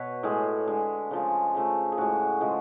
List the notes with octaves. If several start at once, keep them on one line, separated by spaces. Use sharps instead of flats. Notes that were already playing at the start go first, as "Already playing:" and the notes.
Already playing: B2 B4 C#5
A2 G#3
D3 G#3
C#3 F3 G#3
C#3 F3 A3
G#4
A2 G#3 F#4
C#3 F3 G#3